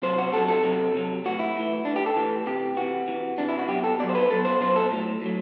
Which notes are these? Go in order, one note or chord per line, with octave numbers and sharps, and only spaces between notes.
C3 F#3 C5
F#4
C3 F#3 A4
A4
C3 F#3
C3 F#3
A2 E3 F#4
E4
A2 E3
A2 E3 D4
G4
A4
A2 E3
C3 E3 G4
C3 E3 F#4
C3 E3
C3 E3 D4
E4
F#4
B2 F#3 G4
A4
B2 F#3 D5
C5
B4
B2 F#3 A4
C5
B2 F#3 C5
A4
A2 F#3
A2 F#3